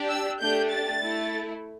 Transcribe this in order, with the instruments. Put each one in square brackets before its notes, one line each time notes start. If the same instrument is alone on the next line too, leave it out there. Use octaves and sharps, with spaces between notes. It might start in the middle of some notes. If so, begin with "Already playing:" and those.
Already playing: [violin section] D4 G4
E6
A3 D4 G4 G6
A6
A3 E4